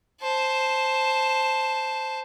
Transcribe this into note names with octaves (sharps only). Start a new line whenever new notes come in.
C5 A5